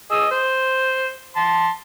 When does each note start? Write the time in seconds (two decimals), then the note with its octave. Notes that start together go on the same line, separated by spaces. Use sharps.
0.11 G#4 D#5 E6
0.31 C5
1.36 A5 C6